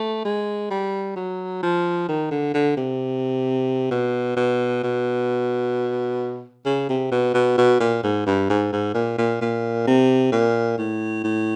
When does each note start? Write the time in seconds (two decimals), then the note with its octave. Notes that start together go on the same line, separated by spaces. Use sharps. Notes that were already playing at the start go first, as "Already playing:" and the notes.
Already playing: A3
0.25 G#3
0.71 G3
1.16 F#3
1.63 F3
2.09 D#3
2.31 D3
2.54 D3
2.77 C3
3.91 B2
4.37 B2
4.84 B2
6.66 C#3
6.89 C3
7.11 B2
7.34 B2
7.58 B2
7.80 A#2
8.03 G#2
8.26 G2
8.50 G#2
8.73 G#2
8.94 A#2
9.18 A#2
9.41 A#2
9.87 C3
10.32 A#2
10.78 A2
11.24 A2